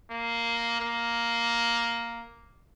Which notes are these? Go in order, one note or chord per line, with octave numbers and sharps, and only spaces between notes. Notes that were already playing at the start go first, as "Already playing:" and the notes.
A#3
A#3